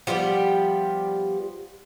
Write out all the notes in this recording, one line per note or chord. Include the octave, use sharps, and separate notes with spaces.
F3 G3 B3 G4